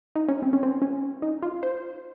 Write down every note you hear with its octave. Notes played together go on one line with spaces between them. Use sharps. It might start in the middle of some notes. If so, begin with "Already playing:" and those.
D#4
C#4
C4
C#4
C4
C#4
D#4
F4
C5